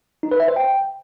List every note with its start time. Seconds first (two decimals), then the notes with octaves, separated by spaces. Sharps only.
0.23 D#4
0.31 B4
0.40 E5
0.48 C5
0.56 G5